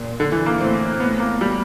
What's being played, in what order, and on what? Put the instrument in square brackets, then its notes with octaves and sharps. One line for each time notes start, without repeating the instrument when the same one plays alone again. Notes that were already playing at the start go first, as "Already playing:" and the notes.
Already playing: [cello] A#2
[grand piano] D3
E3
A#3
[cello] A2 [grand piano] C4
[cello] A2 [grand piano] B3
[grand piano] A#3
G3